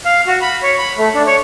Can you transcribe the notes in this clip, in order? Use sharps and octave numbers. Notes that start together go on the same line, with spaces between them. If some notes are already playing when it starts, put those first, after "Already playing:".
F5
F#4
B5
C#5
B5
A3
D4
C#5